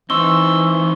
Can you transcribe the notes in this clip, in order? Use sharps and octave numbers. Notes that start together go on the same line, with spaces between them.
E3 C4 D#4 C6 C#6 E6 G7